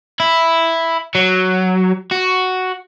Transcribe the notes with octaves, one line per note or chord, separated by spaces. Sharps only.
E4
F#3
F#4